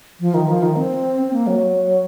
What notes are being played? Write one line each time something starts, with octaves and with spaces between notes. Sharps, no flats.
F3
D#3
F3
D#3
C4
C4
A#3
F#3